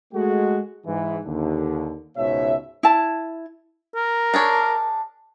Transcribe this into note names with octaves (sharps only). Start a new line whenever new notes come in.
G#3 A3 F#4
G#2 E3
D#2 D3
C#2 G#2 B2 C#5 E5
E4 A5
A#4
D4 G#4 C#5